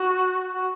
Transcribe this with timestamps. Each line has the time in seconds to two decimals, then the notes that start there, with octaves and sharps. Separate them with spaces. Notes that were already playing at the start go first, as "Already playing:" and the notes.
Already playing: F#4
0.54 F#4